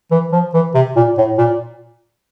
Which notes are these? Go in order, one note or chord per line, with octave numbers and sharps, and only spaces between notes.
E3
F3
E3
C3
A#2
A2
A#2